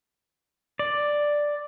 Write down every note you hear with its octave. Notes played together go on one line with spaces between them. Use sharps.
D5